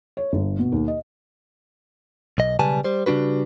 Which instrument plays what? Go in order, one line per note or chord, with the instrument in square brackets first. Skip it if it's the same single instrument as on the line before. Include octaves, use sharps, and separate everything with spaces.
[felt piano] C#5
G1
B2
D#2
D#5
[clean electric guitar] B1 D#5
B1 C#3 G3 B4 G#5 A5
G3 C5
C#3 G3 D4 F#4 B4